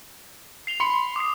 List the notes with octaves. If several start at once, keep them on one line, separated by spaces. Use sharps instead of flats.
C7 F7 G7
B5 C6 C#7
D6 D#6 C7